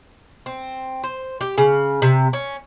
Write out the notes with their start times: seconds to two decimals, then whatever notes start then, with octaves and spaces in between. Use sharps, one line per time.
0.46 C4
1.04 C5
1.41 G4
1.58 C#3
2.02 C3
2.33 C#4